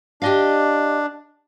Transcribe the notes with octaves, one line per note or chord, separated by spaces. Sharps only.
D4 G4 D#5 F5